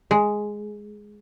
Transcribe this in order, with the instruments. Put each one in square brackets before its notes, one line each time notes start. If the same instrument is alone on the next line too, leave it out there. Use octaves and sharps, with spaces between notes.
[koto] G#3